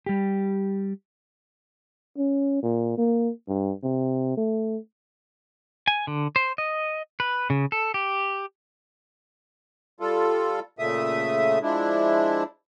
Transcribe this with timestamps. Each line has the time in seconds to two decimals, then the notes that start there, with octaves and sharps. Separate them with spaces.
0.06 G3 G4
2.18 C#4
2.63 A#2
2.98 A#3
3.48 G2
3.83 C3
4.37 A3
5.87 G#5
6.07 D3
6.36 C5
6.58 D#5
7.20 B4
7.50 C#3
7.72 A4
7.94 G4
10.00 G3 F4 A4
10.79 A#2 C#3 A3 E5 D#6
11.62 F3 G#3 D4 E4